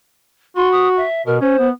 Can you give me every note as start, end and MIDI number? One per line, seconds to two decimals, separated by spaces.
0.56 1.03 66
0.56 0.69 84
0.72 0.88 87
0.96 1.22 76
1.26 1.40 47
1.26 1.38 70
1.41 1.57 61
1.41 1.67 72
1.59 1.71 59